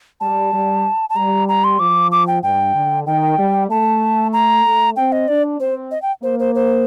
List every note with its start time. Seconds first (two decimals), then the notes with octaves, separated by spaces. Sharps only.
0.21 G3 A5
0.53 G3
1.10 A5
1.16 G3 A#5
1.49 A#5
1.64 C6
1.79 F3 D6
2.12 D6
2.27 G5
2.43 G2 G5
2.75 D3
3.07 D#3 G5
3.38 G3
3.70 A3 A5
4.33 A#5
4.66 A3
4.96 C4 G5
5.12 D#5
5.28 D4 D5
5.60 C4 C5
5.91 D#5
6.02 G5
6.23 A#3 C5
6.39 C5
6.55 C5